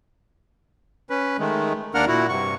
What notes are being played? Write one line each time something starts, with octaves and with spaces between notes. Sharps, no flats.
C#4 B4
D#3 G#3 A3
D#2 A#3 D4 A#4 F#5 F6
A#2 E4 F#4
G2 C3 C#6